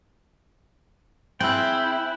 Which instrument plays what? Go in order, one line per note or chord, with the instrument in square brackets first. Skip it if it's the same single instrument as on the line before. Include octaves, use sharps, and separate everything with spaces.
[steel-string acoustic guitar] C4 G#4 [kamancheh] E4 [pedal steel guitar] G5 [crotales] E6 F#6 F#7